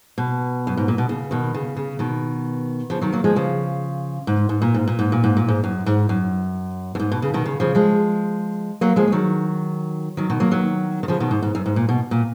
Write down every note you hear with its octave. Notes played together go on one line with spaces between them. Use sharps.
B2
F#2
G#2
A#2
B2
C#3
B2 D#3
C#3
C#3
B2 D#3
C#3 F3
D#3 F#3
F#3 A#3
F3 G#3
C#3 F3
G#2
G#2
A#2
G#2
A#2
G#2
A#2
G#2
A#2
G#2
F#2
G#2
F#2
F#2
G#2
B2
C#3
B2 D#3
C#3
C#3 F3
F3 G#3
F#3 A#3
F3 G#3
F3
D#3 F#3
D#3 F#3
B2 D#3
F#3 A#3
D#3 F#3
D#3
C#3 F3
B2 D#3
G#2
G#2
F#2
G#2
A#2
B2
A#2